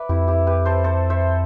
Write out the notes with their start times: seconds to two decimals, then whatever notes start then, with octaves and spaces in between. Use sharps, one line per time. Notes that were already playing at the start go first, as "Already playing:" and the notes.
Already playing: B4 D5 E5
0.09 F2 E4 G4
0.28 E4 G4
0.47 G4 B4
0.65 A4 C5
0.84 A4 C5
1.10 C5 E5